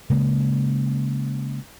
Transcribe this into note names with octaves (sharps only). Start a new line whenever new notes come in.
C#3 G#3 A#3